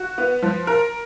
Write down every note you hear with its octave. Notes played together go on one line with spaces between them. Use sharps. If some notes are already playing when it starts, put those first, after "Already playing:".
Already playing: F#4
B3
F3
A#4